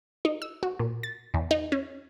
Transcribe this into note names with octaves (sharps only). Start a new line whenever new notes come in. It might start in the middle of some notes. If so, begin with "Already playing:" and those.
D#4
E6
F#4
A#2
A6
E2
D#4
C#4